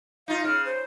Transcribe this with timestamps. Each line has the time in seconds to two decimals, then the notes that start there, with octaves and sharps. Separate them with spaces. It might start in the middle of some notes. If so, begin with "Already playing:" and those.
0.28 D#4 F4 F5
0.45 C#3 F6
0.65 C5